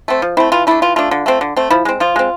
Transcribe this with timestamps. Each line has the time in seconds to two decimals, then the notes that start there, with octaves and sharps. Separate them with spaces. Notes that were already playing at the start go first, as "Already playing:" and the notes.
0.08 A3 C4
0.22 F3
0.37 A3 C4 E4
0.52 E3 F4
0.67 A3 D4 E4
0.82 E3 F4
0.96 A3 D4 F4
1.11 D3
1.26 A3 C4
1.41 D3
1.56 A3 C4
1.70 F3 E4
1.85 G#3 C4
2.00 F3 F4
2.16 G#3 C4